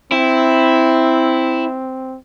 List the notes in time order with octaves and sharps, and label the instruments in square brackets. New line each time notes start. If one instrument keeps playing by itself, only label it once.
[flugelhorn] C4 [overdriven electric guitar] E4